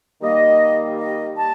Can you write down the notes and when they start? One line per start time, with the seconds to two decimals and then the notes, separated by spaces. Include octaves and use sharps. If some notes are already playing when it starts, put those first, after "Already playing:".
0.21 D#3 G3 A#3 D#5
0.98 D#5
1.37 A5